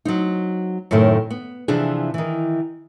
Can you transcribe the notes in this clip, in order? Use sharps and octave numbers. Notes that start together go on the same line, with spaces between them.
F#3 C4 D#4
F#2 A2 C3 D#3 A4
B3
C3 E3 F3 D4 G#4
D#3 E3